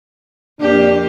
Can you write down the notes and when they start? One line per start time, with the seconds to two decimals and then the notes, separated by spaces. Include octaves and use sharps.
0.60 F2 A#3 D4 G4